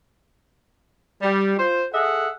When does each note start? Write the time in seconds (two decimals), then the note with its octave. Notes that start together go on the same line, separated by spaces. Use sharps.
1.21 G3
1.56 F4 C5
1.92 G#4 A4 D#5 E5 F#5